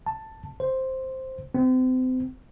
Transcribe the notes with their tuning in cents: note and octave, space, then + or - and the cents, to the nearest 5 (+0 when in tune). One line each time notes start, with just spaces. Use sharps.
A5 +5
C5 +5
C4 -35